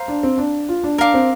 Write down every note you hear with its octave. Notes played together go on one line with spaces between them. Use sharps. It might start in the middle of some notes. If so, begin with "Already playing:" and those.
Already playing: C5 F5 A#5
D4
C4
D4
F4
D4
D4 A#4 F5 D6
C4